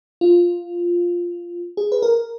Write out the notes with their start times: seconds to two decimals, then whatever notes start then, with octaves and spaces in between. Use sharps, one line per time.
0.21 F4
1.77 G#4
1.92 B4
2.02 A#4